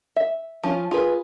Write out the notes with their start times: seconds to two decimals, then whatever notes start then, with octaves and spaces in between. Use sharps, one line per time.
0.16 E5
0.63 F3 C#4 F4
0.91 F4 G#4 B4